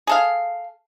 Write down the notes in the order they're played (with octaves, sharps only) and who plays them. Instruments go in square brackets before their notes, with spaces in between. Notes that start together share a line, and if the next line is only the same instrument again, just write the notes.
[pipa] G#4 A4 F5